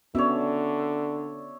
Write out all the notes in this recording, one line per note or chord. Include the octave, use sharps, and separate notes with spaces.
D3 B3 C#4 F#4 C#5 D5 E5